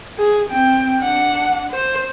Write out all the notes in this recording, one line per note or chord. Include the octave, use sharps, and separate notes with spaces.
G#4
C4 G5
D4 F#5
C5